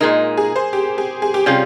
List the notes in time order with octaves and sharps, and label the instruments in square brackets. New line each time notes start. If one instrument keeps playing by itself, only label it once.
[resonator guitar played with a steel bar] A#2 G#3 D#4 [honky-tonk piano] A#4
[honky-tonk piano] G#4
C5
G4
G#4
G#4
G4
[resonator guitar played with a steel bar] C3 G3 C#4 F4 [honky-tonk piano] G#4